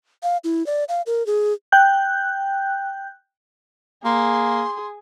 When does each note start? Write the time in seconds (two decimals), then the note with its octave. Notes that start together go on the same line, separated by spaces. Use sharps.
0.23 F5
0.44 E4
0.66 D5
0.89 F5
1.07 A#4
1.26 G#4
1.72 G5 F#6 G6
4.05 A#3 G#4 C6